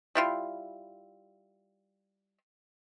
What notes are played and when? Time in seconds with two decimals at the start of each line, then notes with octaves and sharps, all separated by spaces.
0.15 G3 E4 F4